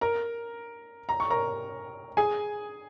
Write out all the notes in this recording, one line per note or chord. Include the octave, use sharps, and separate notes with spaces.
A#4 A#5
A#5
C#6
A#4 A#5
G#4 G#5